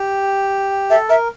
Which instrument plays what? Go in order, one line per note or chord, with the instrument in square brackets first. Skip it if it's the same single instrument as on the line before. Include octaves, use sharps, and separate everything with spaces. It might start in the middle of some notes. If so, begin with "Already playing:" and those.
Already playing: [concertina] G4
[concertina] A4 [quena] E5
[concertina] A#4 [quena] E5